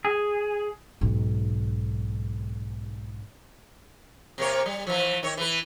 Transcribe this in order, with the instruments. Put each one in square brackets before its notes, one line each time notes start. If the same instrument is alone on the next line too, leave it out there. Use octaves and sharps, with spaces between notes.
[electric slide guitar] G#4
[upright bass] B1 G#2
[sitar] C3 A#3 C#5
G3
E3 F3
D#3 C#5
E3 B4